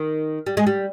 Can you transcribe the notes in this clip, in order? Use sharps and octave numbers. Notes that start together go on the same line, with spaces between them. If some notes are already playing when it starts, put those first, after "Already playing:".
Already playing: D#3
G3
G#3
G3